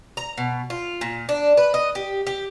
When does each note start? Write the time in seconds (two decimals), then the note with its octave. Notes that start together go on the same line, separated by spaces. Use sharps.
0.17 A#5
0.37 B2
0.70 F4
1.01 A#2
1.29 D4
1.57 B4
1.74 D#5
1.95 G4
2.27 G4